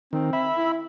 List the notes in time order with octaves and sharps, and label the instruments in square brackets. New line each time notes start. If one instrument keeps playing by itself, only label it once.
[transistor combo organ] D#3 [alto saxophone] C4
[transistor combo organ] E5 B5
[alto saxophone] E4